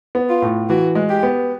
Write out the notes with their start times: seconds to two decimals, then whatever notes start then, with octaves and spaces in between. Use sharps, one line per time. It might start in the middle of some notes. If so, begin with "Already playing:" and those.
0.15 B3
0.29 F4
0.42 A2
0.69 E3 F#4
0.95 G#3
1.09 G4
1.23 B3